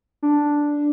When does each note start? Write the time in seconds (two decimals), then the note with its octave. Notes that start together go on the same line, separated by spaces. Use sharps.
0.23 D4